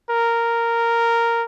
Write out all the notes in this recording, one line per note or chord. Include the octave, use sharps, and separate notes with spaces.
A#4